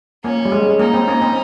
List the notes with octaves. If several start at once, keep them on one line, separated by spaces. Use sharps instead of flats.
A#3 C#4
G3
G#3
A#3 D#4
C4
A#3 C#4
C4